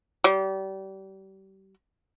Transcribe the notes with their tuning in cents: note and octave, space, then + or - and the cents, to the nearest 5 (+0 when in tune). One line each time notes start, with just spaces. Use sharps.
G3 -30